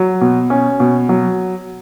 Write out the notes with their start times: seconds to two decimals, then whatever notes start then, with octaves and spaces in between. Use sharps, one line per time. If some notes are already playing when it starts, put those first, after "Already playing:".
Already playing: F#3
0.21 B2
0.50 C#4
0.80 B2
1.09 F#3